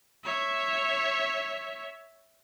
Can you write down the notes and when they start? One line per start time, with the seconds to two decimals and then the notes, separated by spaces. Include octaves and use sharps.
0.24 C#5 E5